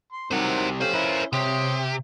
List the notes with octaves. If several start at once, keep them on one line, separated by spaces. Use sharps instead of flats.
C6
C2 C3 D#3 F#3 A#4 C5 F#5
A3 C#4 G4 C5 F5
C#4 E4 A#4 B4
C3 G4 C#5 C6 D#6